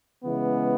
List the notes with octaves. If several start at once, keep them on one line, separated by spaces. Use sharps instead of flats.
C#3 E3 G#3 B3